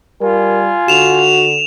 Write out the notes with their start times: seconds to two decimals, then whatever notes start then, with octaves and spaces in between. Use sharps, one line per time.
0.21 G3 F4 A#4 G#5
0.88 D3 F#4 E7 F7